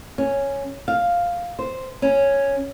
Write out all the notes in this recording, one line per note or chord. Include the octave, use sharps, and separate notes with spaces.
C#4
F5
C5
C#4